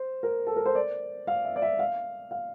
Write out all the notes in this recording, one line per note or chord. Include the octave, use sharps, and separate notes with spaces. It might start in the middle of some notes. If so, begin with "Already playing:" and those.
Already playing: C5
A#4
A4
A#4
C5
D5
F5
E5
D5
E5
F5
F5